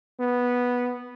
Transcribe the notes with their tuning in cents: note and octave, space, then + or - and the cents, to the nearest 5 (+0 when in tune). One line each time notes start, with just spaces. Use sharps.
B3 -10